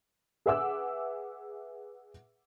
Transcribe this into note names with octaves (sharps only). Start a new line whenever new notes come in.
G#4 B4 E5 F#5 D6 E6